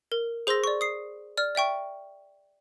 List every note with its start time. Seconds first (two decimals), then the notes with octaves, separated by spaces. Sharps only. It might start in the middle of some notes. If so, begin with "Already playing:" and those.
0.12 A#4
0.47 G#4 C5 C6 E6 A#6
0.64 D5 C#6
0.81 D#6 C7
1.37 D5 F6
1.55 D5 E5 G5 C#6